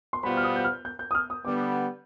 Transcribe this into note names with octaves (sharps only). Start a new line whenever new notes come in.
C6
B2 G3 B3 F4 C5 B5
F6
D#6
G6
F6
G6
G6
D#6
F6
D#6
D3 G3 B3 D6